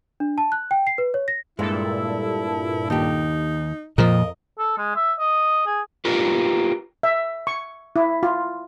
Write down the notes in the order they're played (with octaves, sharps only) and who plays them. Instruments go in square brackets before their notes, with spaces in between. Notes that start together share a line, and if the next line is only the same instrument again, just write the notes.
[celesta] D4
A5
F#6
G5
C7
B4
C#5
A#6
[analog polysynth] G2 A#2 A4 [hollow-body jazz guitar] G#3 [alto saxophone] E4
[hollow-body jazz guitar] D#2 G4 [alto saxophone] D#4
[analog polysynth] F2 [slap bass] A#2 F3 [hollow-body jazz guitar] A#4 [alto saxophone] D#5
[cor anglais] A4
G#3
E5
D#5
G#4
[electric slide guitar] F4 G4 A#4 B4
[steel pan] E5
C#6
E4
F4